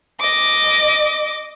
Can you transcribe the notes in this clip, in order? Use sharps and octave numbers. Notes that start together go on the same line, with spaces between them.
D#5 D6